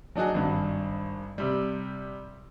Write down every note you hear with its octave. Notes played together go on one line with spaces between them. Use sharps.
F#3 D4 D#4 F#4 G#4
G#1 G2
C3 G3